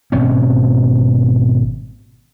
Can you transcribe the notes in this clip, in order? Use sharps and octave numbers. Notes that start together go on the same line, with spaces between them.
G#1 B2 C4 C#4